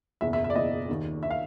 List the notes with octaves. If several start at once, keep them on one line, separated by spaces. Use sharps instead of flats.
F#1 E2 B2 E5
E5
E5
D5
F#1 E2 B2 D#5
D#2 D#3
D#3 E5
F5